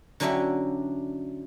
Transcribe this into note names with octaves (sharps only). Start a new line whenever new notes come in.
D3 F#3 C#4 D4 E4 G4